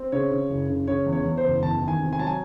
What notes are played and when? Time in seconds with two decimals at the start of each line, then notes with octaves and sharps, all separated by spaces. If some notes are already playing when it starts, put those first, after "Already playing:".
Already playing: C4
0.12 C#3 C#5
0.31 C#3
0.50 F#1
0.69 C#3
0.87 C#3 C#5
1.06 E2
1.12 C#5
1.25 E2
1.37 C5
1.43 F#1
1.63 E2 A5
1.81 D#3
1.88 G#5
2.00 C3
2.13 G#5
2.19 F#3 A5
2.27 G#5